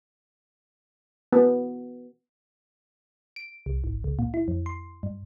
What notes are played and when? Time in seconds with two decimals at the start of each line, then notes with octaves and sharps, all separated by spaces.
1.33 B3
3.36 D7
3.66 C2
3.84 G#1
4.04 C#2
4.19 A#2
4.34 E4
4.48 F2
4.66 C6
5.03 G2